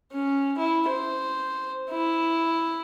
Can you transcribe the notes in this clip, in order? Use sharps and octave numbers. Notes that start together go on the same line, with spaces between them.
C#4
E4
C5
E4